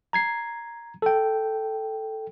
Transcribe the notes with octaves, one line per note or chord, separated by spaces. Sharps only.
A#5 G#6 C7
A4 G5